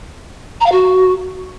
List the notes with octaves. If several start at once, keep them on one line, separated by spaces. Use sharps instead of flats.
A#5
F5
F#4